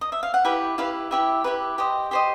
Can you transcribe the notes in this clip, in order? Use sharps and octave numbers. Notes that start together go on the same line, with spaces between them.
D#5
E5
F5
F#5
E4 G4 B4 G5
E4 G4 B4 F5
E4 G4 B4 E5
E4 G4 B4
G4 C5 D#5
G4 C5 D#5 G5